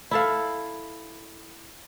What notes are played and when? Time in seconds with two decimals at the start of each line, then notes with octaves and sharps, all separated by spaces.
0.11 E4 A4 F5